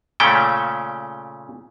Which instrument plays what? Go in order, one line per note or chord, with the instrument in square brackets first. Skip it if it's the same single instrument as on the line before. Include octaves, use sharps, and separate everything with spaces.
[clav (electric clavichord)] A#2 C#3 A3 C#4 G5